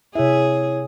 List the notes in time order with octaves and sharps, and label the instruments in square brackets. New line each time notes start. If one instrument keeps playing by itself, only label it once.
[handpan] C3 E5 [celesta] E4 C#5 [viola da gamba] G#4